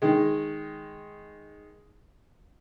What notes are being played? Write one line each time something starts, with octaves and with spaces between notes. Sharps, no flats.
D#3 G#3